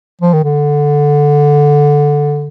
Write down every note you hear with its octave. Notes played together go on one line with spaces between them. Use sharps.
F3
D#3
D3